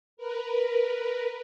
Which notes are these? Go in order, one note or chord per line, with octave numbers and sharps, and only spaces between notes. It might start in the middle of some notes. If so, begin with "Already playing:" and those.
A#4 B4